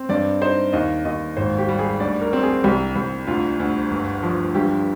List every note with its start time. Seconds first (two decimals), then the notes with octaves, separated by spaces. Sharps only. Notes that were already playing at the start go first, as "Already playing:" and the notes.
Already playing: C4
0.09 G2 D5
0.41 D#4 C5
0.73 D#2 D#5
1.05 D#2 D#5
1.37 G#1 C5
1.58 G4
1.69 G3
1.79 G#4
2.00 D2 D5
2.21 A#4
2.33 C4
2.43 G#4
2.64 C2 G4
2.96 C2
3.27 D2 F4
3.60 D2
3.91 G1
4.23 F3
4.55 G2 G4